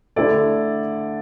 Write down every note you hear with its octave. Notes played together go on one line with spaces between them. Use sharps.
D3 A3 E4 A4 D5